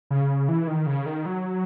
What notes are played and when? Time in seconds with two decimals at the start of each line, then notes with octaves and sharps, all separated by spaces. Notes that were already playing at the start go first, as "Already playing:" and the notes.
0.11 C#3
0.49 E3
0.67 D#3
0.86 C#3
1.06 D#3
1.26 F#3